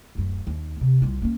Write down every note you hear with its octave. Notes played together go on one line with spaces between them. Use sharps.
D1 F#2
D#2
C3
C2 F4
A#3 C#4